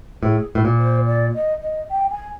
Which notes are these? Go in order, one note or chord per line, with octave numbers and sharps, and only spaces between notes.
A2 G#4
A2
A#2
C5
D5
D#5
D#5
G5
G#5